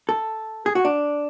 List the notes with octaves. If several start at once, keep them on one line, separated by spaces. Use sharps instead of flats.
A4
G#4
F#4
D4